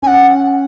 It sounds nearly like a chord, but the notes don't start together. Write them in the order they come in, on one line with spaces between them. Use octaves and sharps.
C#4 G#5 F#5